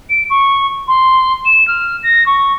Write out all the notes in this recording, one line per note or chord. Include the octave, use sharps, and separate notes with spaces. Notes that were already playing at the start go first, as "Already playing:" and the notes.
D7
C#6
C6
E7
F6
A#6
C#6